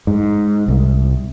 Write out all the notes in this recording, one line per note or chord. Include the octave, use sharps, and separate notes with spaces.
G#2
C2